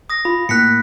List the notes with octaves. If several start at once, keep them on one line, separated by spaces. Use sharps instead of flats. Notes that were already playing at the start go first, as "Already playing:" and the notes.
D#6 A#6
F4 B5
A2 A#3 F#6 B6 C#7